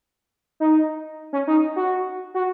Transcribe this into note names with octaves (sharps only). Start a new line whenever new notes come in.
D#4
C#4
D#4
F#4
F#4